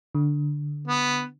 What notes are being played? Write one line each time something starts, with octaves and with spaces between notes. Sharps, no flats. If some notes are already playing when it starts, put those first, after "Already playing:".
D3
B3